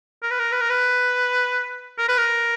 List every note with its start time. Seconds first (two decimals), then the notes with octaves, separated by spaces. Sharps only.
0.23 A#4
0.31 B4
0.39 A#4
0.52 B4
0.61 A#4
0.70 B4
1.98 A#4
2.09 B4
2.18 A#4